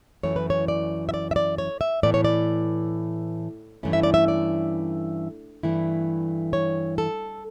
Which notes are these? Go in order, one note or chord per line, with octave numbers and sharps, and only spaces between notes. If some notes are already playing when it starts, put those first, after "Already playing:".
F#2 E3 A3 C#5
B4
C#5
D5
E5
D5
E5
D5
C#5
E5
A2 E3 B3 D5
C#5
D5
G2 E3 A3 C#4 E4
E5
D5
E5
D5
G2 E3 A3 E4
C#5
A4